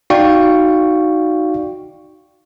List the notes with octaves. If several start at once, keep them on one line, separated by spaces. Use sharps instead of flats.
D#4 F#4 D5 F5 G5 C#6